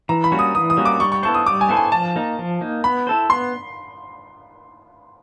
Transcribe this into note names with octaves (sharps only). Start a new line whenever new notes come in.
E3 A#5
B5
G3 A#3 C#4 F#4
D#6
E3 D#6
D#6
G3 A#3 C#4 F#4
D6
G3 C#6
C#6
B3 E4 A4 C5 C#6
D#6
G3 D6
G#5
B3 E4 A4 C5
G#5
F3 A5
A#3 D#4
F3
A#3 D#4
B3 B5
E4 A4 C5
B3 C6